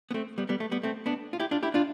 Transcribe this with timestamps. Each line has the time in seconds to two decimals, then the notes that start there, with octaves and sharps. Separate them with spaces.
0.11 B3
0.14 A3 C4
0.38 G3 B3
0.49 G3 B3
0.60 A3
0.71 G3 B3
0.83 A3 C4
1.06 B3 D4
1.33 F4
1.40 E4 G4
1.51 D4 F4
1.63 E4 G4
1.74 D4 F4